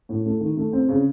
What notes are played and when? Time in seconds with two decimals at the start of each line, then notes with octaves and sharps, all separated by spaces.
0.09 A2
0.26 A3
0.40 D#3
0.57 A3
0.73 C4
0.89 C#3